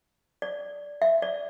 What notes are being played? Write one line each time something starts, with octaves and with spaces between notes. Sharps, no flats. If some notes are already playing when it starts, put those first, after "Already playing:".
D5
E5
D5